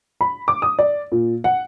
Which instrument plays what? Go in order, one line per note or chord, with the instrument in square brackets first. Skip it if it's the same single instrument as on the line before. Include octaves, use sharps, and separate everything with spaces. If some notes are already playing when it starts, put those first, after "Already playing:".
[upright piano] B5
D6
D#6
D5
A#2
F#5